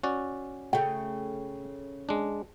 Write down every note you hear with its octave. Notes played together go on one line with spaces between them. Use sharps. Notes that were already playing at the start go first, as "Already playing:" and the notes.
C#4 F#4 D5
C#3 A3 G5
G#3 D4